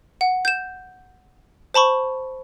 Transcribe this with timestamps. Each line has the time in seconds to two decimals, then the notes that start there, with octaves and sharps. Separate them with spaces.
0.21 F#5
0.45 G6 E7
1.74 C5 A5 B5 C#6